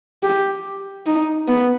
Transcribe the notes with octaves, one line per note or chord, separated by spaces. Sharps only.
G4
D#4
B3